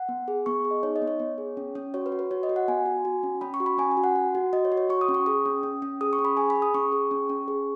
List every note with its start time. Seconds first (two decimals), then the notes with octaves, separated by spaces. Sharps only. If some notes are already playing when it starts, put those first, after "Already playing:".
Already playing: F#5
0.09 B3
0.28 G#4
0.46 B3 C#6
0.65 G#4
0.71 D#5
0.83 D#4 C#5
0.96 D#5
1.02 B3
1.07 C#5
1.20 B3
1.38 G#4
1.57 C#4
1.75 C#4
1.94 F#4 C#5
2.06 B4
2.12 F#4
2.19 B4
2.31 F#4 C#5
2.43 D#5
2.49 F#4
2.56 F#5
2.68 B3 G#5
2.86 F#4
3.05 F#4
3.23 C#4
3.41 C#4 B5
3.54 C#6
3.60 F#4
3.66 B5
3.78 C#4 G#5
3.91 G#5
3.97 F#4
4.04 F#5
4.16 F#4
4.35 F#4
4.53 F#4 D#5
4.65 C#5
4.72 F#4
4.77 C#5
4.89 F#4 C#6
5.01 D#6
5.08 C#4
5.14 C#6
5.26 G#4 D#6
5.46 C#4
5.63 C#4
5.82 C#4
6.01 G#4 D#6
6.13 C#6
6.19 C#4
6.25 B5
6.37 G#4 G#5
6.50 B5
6.56 G#4
6.62 D#6
6.74 C#4 C#6
6.92 G#4
7.11 C#4
7.29 C#4
7.48 G#4